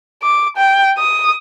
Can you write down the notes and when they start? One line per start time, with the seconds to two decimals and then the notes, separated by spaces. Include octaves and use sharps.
0.23 D6
0.57 G5
0.98 D#6